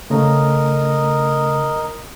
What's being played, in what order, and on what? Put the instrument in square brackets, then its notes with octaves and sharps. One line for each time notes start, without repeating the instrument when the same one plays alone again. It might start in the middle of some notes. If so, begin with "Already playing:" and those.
[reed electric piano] C#3 A3 C#4 [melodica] A#4 D#5